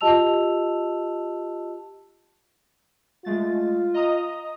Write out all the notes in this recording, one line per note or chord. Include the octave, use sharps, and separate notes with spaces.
F4 G4 D#5 A5 E6 F7
G#3 A3 F4 A6
D#5 A#5 D#6